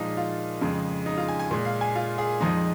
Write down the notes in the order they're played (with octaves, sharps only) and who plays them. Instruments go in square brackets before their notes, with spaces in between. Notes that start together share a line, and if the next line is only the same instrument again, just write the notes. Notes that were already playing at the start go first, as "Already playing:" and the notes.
Already playing: [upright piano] A#2 F3 G#3 D#4 F4
F4
F2 C#3 G#3
D#4
F4
G#5
G#5
A#2 G#3
F5
G#5
F4
G#4
F2 F3 G#3 D#4